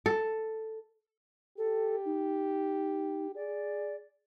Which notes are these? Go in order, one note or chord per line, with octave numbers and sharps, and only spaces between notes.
A4
G4 A4
D#4
G#4 D5